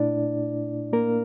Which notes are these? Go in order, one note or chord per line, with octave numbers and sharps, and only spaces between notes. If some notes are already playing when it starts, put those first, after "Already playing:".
Already playing: A#2 A3 D4 E4 D5
A#3 A#4